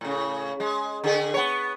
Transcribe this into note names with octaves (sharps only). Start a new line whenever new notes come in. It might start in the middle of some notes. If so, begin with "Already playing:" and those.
A2 C#3
G#3
D3 G#4
B3 C#5